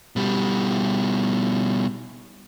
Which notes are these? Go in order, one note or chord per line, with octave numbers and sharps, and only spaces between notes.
B2 G3